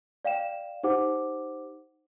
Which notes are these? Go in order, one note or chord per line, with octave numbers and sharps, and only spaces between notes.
D5 F5 G5 E7
D#4 G4 C5 F#5 D6